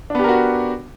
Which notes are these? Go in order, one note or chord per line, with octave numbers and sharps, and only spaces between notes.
B3 D4 F#4 G4 A#4